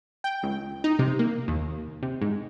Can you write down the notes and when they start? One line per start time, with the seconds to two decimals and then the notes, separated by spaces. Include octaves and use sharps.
0.24 G5
0.43 C#2
0.84 D#4
0.99 C3
1.19 A#3
1.48 D#2
2.02 C3
2.21 G#2